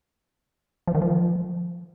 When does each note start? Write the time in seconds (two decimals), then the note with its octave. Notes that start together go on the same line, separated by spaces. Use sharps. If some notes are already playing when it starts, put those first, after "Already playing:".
0.87 F3
0.95 D#3
1.02 F3